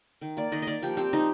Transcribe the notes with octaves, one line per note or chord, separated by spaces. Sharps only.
D#3
A#3 D5
D#3 D#5
A#3 D5 D#5
F3 G4
C4 G4
F3 D#4